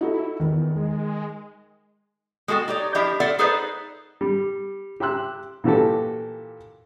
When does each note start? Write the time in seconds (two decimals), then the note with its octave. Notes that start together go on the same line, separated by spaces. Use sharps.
0.01 D#4 E4 F#4 A4
0.40 E2 D#3
0.76 G#3
2.48 G#3 F#4 A4 F5 G5
2.68 D#4 G4 C#5 D5
2.95 F3 D4 E4 G4 D#5 E5
3.20 F4 A4 D5 E5 F#5
3.39 D#4 G#4 A4 B4 C5 D5
4.21 G3
5.00 G4 G5 C6 E6 F#6
5.64 A#2 E3 F#4 G4 A4